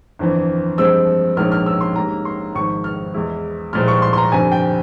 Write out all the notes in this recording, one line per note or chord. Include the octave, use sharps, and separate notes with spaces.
G1 F2 E3
G2 F3 G#3 C4 E6
A#1 G#2 F3 A#3 C#4 F6
F6
E6
C6
G#2 G3 A#3 C#4 A#5
C6
G#1 G#2 F3 C#6
F6
E2 E3 G#3 E4
C2 A#2 F3 G#3 F6
C#6
C6
C6
A#5
G1 F2 C3 G#5
G5